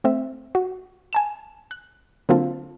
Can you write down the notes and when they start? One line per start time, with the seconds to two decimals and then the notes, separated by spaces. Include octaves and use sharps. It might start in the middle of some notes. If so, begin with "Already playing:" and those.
0.04 A3 C4 E5
0.55 F#4
1.13 G#5 A5 E7
1.71 F#6
2.29 D3 F#3 A#3 C4 F4 A4